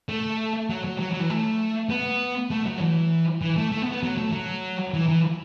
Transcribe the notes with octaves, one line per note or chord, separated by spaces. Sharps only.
A3
F#3
F#3
F#3
F#3
E3
A3
B3
A3
F#3
E3
E3
A3
A3
B3
B3
F#3
A3
F#3
E3
E3